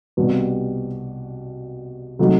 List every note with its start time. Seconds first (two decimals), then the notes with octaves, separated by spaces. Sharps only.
0.17 C2 B2 G3 B3 F#4
2.19 C3 F#3 A3 D#4 F#4